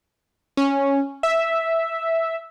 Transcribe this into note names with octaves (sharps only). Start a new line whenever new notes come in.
C#4
E5